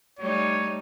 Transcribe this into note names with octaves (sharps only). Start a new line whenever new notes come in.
G3 A3 D#4 C#5